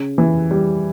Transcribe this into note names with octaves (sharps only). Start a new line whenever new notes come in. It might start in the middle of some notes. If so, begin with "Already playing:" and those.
Already playing: C#3
E3
G3